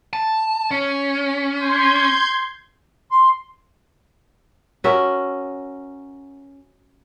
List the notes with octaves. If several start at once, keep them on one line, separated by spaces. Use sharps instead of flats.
A5
C#4
C6 G6 G#6
C6
C#4 F#4 A#4 E5